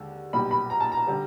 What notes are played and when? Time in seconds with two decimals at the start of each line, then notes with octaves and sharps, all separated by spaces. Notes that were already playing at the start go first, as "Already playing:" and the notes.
Already playing: D#2 D3 G#3
0.33 B1 A#2 G3 B5
0.51 B5
0.70 A#5
0.80 A5
0.92 A#5
1.07 D3 G3